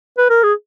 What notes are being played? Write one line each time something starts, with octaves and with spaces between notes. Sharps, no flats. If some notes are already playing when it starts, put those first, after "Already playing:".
B4
A#4
G#4